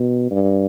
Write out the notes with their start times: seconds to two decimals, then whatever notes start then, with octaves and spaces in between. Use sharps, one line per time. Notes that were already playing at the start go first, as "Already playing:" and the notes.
Already playing: B2
0.31 G2